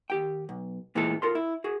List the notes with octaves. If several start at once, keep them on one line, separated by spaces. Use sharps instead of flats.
D#2 G4 G5
B1
A#2 E3 G#3 A3 C4 A4
F4 A4 A#4 C6
E4
F#4 G#4